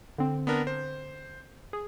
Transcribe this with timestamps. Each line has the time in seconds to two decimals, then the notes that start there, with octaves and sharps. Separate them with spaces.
0.18 D3 C4
0.47 B3 D4 A#4
0.67 C5
1.73 G#4